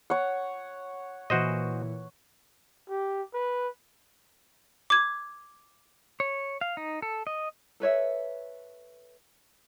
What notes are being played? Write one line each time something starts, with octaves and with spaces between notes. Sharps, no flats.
C#5 F#5
A#2 E3 F#4 C5 D#5
G4
B4
D6 G#6
C#5
F5
D#4
A4
D#5
A4 B4 C#5 E5